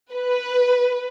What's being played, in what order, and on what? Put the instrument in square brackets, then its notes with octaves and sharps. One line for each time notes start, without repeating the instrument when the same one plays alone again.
[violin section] B4